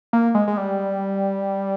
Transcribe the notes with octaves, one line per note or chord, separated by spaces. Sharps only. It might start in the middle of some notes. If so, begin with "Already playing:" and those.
A#3
G#3
G#3
G3